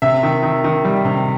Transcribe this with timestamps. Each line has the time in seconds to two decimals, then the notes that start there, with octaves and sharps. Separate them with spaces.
0.02 C3 E5
0.23 D#3
0.43 D#3
0.64 D#3
0.85 G3
1.05 C3